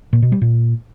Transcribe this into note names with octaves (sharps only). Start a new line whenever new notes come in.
A#2
B2
G3
A#2